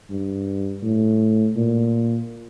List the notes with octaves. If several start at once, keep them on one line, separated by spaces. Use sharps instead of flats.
G2
A2
A#2